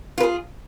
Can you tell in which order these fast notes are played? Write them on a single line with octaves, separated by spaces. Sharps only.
F4 B4 G#4